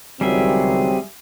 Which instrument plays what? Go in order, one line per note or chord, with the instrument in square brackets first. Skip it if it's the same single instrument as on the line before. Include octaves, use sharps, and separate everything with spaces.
[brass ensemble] C#2 D#3 F#3 [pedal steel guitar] G3 G#4 E5 [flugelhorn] C4